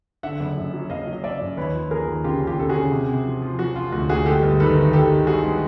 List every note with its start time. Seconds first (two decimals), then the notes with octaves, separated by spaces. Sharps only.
0.23 D3 E5 F#5
0.40 F#1
0.57 F#2
0.73 F#3
0.90 F#1 D#5 F5
1.07 F#3
1.13 D#5
1.24 F#1 D5 E5
1.41 F#2
1.57 D#2 B4 C#5
1.74 F3
1.91 D#2 G#4 A#4
2.08 D#2
2.24 C#3 F4 G4
2.42 D#2
2.47 F4 G4
2.58 C#3 A4
2.69 F#4 G#4
2.75 C#3
2.92 C3
3.09 C3
3.25 F3
3.42 F3
3.59 F3 F#4
3.76 F3 F4
3.92 D2 F#4
4.09 D2 F#4 G#4
4.26 G#3 G4 A4
4.43 G1
4.60 D#3 A4 B4
4.76 D#3
4.93 D#3 G4 A4
5.10 D#3
5.27 G#3 F#4 G#4
5.44 G#3